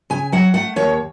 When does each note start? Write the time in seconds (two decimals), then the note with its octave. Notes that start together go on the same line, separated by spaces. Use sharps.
0.10 C#3 G#5
0.32 F#3 F#5
0.54 A3 F#5
0.76 D#2 C#5